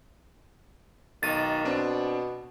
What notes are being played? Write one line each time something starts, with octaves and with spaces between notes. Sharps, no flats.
B1 D#3 A6 D#7
B2 C4 D4